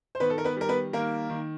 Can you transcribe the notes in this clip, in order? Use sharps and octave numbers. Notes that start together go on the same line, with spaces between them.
C5
D#3 B3 B4
A4
A#4
B3 B4
G3 A#4
B3 B4
D#3 A#3 A#4
D#3